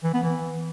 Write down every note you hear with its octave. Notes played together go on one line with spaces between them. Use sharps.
E3
B3
E3